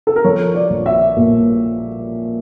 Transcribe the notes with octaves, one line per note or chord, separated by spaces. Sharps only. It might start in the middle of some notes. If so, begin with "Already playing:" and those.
A4
A#4
F3 C#5
D5
A#1
E5
A#2